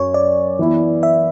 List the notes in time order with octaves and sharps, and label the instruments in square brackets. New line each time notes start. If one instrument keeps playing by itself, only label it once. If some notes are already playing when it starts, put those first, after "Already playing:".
Already playing: [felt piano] F#2 [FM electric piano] C#5
[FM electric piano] D5
[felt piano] E3 B3 E4
[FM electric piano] E5